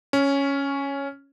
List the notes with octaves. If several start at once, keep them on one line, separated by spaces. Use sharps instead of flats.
C#4